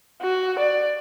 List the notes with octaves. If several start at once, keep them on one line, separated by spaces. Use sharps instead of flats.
F#4
D5